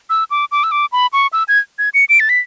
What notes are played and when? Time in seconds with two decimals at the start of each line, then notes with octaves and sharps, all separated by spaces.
0.10 E6
0.31 D6
0.52 D6
0.64 E6
0.72 D6
0.92 B5
1.13 C#6
1.33 E6
1.48 G#6
1.79 G#6
1.94 C#7
2.09 D7
2.20 A6
2.29 B6